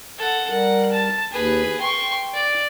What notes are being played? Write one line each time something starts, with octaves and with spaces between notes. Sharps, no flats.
A4 F#5
G3 A#4 F#5
A5
D#2 G#4 B4
G5 C6 C#6
D5